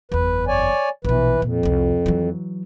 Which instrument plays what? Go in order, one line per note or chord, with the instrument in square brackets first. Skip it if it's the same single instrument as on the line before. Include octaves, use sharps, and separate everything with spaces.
[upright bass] F#1 E2 [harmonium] B4
[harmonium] C#5 D5 G#5
[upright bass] A#1 B2 [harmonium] E3 B4
[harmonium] F2 [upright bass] A#2
[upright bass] C2 F4
E3 F#3